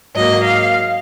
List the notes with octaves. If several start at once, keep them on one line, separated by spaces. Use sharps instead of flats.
G#2 F#3 A#3 D#5
F5